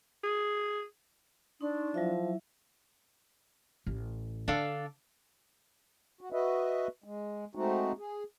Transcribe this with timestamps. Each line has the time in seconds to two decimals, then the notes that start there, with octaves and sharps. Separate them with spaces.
0.23 G#4
1.61 D4 D#4 C6 C#6
1.94 F3 F#3 E4 E5
3.86 A1
4.48 D3 D4 A4 F5
6.21 F#4
6.32 F#4 B4 D#5 E5
7.04 G#3
7.55 G#3 A3 C4 D#4 F#4
7.98 G#4